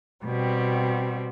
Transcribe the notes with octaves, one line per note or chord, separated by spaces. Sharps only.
B2 G3 C4